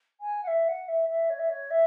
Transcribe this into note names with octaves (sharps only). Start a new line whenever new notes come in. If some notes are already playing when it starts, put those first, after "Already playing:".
G#5
F#5
E5
F#5
E5
E5
C#5
E5
C#5
E5